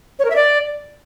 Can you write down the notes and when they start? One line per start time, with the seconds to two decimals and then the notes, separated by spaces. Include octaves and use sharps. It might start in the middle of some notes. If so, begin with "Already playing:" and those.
0.19 C#5
0.25 A#4
0.30 E5
0.36 D5